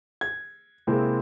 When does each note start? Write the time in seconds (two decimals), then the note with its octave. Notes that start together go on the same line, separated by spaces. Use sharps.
0.21 G#6
0.87 C3 G#3 A#3 C4 E4